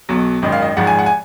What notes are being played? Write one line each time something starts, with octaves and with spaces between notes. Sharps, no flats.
B1 B2 F#3
G#1 F#2 D#3 D#5
F5
D#5
G#1 G#2 F3 F#5
G#5
F#5
G#5